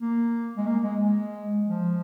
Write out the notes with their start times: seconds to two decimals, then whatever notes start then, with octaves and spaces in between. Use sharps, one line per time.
0.01 A#3
0.57 G#3
0.67 A#3
0.83 G#3
1.01 G#3
1.66 F3